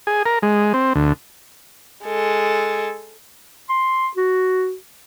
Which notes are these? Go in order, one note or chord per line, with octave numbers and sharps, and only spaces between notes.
G#4
A#4
G#3
C4
D2
G#3 A4
C6
F#4